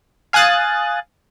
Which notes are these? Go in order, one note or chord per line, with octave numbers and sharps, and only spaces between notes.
F5 G#5 D#6 F#6 A6